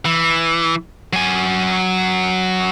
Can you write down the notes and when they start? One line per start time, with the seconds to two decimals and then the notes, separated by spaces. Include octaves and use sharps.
0.05 E3
1.13 F#3 G#5